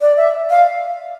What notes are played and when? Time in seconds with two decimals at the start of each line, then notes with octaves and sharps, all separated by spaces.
0.01 D5
0.17 E5
0.50 F5